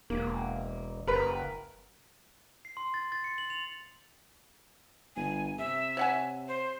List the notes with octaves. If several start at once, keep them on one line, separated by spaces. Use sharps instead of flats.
E1 A#3
F#1 A#4 B4
C7
C6
A6
A6
C#7
F#7
F7
G1 G#5
C3 E5
C#5 F#5 G#5
C5